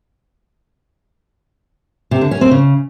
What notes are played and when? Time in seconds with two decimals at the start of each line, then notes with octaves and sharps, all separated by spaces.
2.11 C3
2.21 D3
2.31 C#4
2.41 C4
2.51 C#3